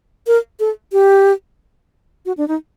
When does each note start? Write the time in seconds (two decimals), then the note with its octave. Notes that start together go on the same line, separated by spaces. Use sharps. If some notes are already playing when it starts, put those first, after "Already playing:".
0.27 A#4
0.60 A4
0.93 G4
2.26 F#4
2.37 D4
2.48 D#4